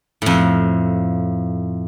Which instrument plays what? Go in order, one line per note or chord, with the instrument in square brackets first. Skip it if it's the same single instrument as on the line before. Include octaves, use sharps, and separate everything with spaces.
[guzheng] F2 A2